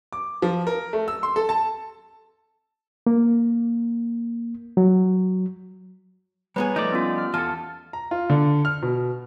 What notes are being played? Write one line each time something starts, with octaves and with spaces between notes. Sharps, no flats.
D6
F3
A#4
A3
E6
C6
A4
A5
A#3
F#3
G3 B3 G#4 B4 C#5 A#5
F3 G3 A3 D#4 D5
B3 C#4 F4
F6
E2 F4 A4 A5
A#5
F4
D3
F6
B2